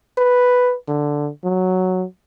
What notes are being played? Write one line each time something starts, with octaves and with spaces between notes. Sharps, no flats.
B4
D3
F#3